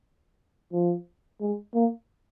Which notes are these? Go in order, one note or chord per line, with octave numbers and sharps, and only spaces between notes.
F3
G#3
A#3